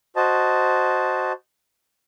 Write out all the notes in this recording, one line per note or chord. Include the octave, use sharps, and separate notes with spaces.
F#4 C5 D#5 A5